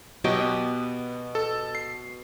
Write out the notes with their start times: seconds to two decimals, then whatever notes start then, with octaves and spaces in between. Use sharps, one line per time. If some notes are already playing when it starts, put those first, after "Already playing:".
0.24 B2 F#3 F#4 G4 D#5 G5
0.40 B3
1.35 A4
1.75 C7